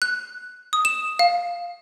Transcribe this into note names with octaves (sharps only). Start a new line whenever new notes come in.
F#6
D#6
E7
F5